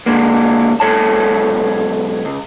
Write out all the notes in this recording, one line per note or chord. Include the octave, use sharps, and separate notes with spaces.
D3 G#3 A#3
B1 G#3 A4 C#5 A5
C#2